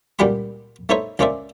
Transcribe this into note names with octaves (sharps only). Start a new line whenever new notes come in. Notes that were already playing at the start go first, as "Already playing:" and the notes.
C#2 A#2 G3 G4 F#5 B5
A3 B3 D#4 C5 C#5 E5
C#2 A#3 C#4 C5 D5 E5